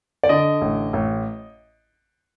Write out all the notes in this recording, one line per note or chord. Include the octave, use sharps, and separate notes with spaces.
D5
D3 D#5
A1
A1